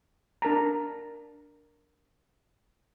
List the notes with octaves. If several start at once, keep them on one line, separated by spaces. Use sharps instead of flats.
D4 A#4 A5 A#5